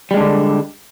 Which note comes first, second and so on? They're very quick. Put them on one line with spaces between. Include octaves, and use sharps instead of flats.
G3 G#3 D4 D3